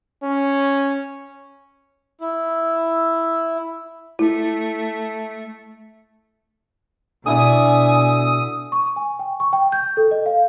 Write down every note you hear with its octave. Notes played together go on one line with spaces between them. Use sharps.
C#4
E4
A3 E4
B2 D3 E4 D5 G#5 D#6
C#6
G#5
G5
C#6
G5
G6
A4
D#5
F5